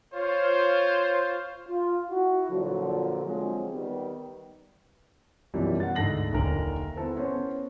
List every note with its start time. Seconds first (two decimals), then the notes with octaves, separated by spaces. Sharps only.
0.13 F4 C5 C#5
1.69 F4
2.09 E4 F#4
2.50 A#2 D3 F3 F#3
3.24 D3 F3 F#3 G#3 C4
3.71 D#3 G3 B3
5.54 F#2 B2 E3 F3 G3
5.80 F#5 A6
5.96 D2 G#2 D3 A4 A#6 F#7
6.33 D#1 D3 A#4
6.96 B3 E4 A4 C5
7.16 B3 C#4 C5 C#5